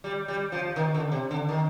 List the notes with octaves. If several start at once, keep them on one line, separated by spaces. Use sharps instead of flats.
G3
G3
F3
D#3
D3
C3
D3
D#3